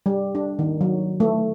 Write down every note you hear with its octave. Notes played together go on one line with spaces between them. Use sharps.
G3
D4
D#3
F#3
A3